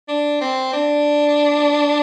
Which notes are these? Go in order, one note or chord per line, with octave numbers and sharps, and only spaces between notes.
D4
C4
D4